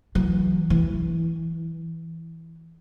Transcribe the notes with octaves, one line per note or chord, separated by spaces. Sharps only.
E3 F#3
E3